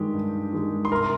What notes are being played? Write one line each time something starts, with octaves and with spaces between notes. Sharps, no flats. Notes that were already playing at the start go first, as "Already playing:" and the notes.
Already playing: G2 D#3 G#3 G4
G2
D#3 G#3
C6
C2 A#4 A#5